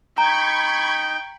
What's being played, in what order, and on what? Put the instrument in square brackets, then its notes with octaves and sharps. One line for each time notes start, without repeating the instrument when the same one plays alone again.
[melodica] D#4 [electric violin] G5 [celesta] A#5 [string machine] B5 C#6 G#6